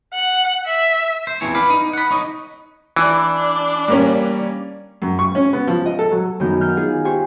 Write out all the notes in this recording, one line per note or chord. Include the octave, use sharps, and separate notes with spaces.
F#5
E5
C5
E2 E3 F3 C4 C#5
B4 D5 F5 B5
D#4
F#5 B5
D#4 C#5 D#5
E3 D4 D5
G3 A#3 C#4
F#2
C#6
C#4
B3
F3
D#5
A4
F#3
F#2 D#3 B3 G6
F6 G6
D#4 F4 G#4
G4 C5 G#5 C#6